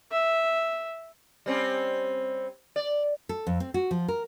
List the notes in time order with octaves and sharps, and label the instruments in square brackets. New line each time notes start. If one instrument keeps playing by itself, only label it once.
[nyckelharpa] E5
[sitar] G3 C4 C#4
D5
[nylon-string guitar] A4
F2
C4
F#4
F3
A#4